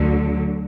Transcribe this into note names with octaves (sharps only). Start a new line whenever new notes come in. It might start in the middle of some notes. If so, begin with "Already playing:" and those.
Already playing: D2 D3 F#3